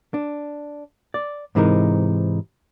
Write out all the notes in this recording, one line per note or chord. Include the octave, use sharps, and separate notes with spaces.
D4
D5
G#2 C3 E3 G#3 D#4 A#4